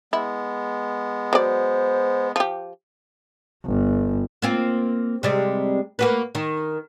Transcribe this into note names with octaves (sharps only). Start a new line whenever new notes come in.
G#3 B3 E4
F#3 C5 D5
F3 G4
G1
A#3 C4 F4
C3 G3 G#3
A#3 F#4 B4
D#3